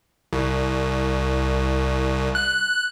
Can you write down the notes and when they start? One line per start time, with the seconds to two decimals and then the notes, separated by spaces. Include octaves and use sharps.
0.33 C2
2.35 F#6